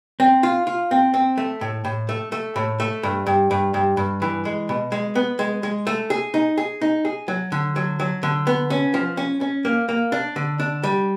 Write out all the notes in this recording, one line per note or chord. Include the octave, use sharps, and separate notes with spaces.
C4
F4
F4
C4
C4
A3
A2
A2
A3
A3
A2
A3
G2
G2
G2
G2
G2
E3
G#3
B2
G#3
B3
G#3
G#3
A3
G#4
D#4
G#4
D#4
G#4
F#3
D3
F#3
F#3
D3
B3
C#4
F3
C#4
C#4
A#3
A#3
D4
D3
D4
G3